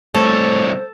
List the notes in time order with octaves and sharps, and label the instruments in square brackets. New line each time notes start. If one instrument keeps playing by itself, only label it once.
[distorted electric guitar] C2 C#5 [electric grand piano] A3 [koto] A4 [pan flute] C5